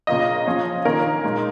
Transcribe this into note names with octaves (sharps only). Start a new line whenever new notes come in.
C#3 A#3 F4 D#5
F3 C#4 F4
D#3 A#3 C#4 F4 A#4
A#2 G#3 D#4